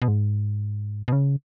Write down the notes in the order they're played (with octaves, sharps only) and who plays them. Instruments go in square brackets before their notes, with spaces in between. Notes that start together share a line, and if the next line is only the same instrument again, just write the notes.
[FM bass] B2
G#2
B2
C#3